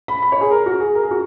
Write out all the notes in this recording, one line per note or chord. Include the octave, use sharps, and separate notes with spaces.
B5
B5
C#5
G#4
A#4
F#4
G#4
A#4
G#4
F#4